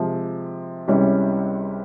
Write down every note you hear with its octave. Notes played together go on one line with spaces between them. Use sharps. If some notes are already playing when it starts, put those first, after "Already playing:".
Already playing: C3 F3 G#3
C#2 C3 E3 G3 C#4